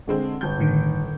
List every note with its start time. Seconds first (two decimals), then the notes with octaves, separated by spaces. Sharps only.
0.08 D3 G#3 C4
0.41 G1 G6
0.59 A2 D3 D#3